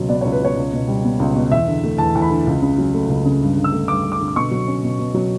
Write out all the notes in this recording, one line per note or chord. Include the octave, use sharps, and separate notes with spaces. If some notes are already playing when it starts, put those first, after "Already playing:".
Already playing: C#2 B2 F#3
B3 D5
C#5
C#2
B4
B2 C#5
C#2
B2
G3
B3
C#2
B2
E2 E5
D3
A3
E2 A5
E2
B5
D3
C#2
C#3
F#3
A3
C#2
C#3
G2
D3
E6
A3
G2 D6
G2
D6
D3
D6
B2 C#6
F#3
C#4
B2
B2
F#3